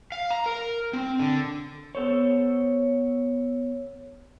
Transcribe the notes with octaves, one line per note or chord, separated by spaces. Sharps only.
F5
A#5
A#4
C4
D3
B3 A4 C5 C#5